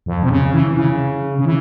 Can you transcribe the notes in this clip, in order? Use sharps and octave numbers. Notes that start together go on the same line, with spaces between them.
F2
C3
C#3
E3
E3
C#3
C#3
E3